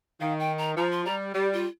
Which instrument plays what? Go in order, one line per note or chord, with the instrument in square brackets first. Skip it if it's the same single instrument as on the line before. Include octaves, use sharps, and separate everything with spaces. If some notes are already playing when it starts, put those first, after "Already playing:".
[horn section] D#3 [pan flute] F5
[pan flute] G5
A#5
[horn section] F3 [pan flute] A#5
[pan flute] C6
[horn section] G3 [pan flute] A#5
[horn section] G3 [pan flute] G4
[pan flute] F4